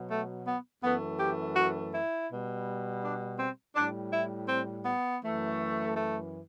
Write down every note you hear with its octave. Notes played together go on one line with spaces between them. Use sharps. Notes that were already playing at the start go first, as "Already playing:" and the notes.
Already playing: B2 F#3
A3
B3
F#2 E3 A3 B3
G4
F#4
E4
B2 G3
D4
C4
A2 G3 D4
E4
C4
B3
F#2 E3 A3
A3